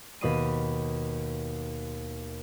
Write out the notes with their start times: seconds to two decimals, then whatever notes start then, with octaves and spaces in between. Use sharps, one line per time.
0.21 D#2 B2 B5 D#6 C7 D#7